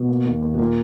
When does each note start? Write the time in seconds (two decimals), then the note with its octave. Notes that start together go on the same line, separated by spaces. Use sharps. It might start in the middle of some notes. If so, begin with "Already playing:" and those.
Already playing: B2
0.08 A#3
0.25 D#2
0.42 D#2
0.54 B2
0.59 A#2 A#3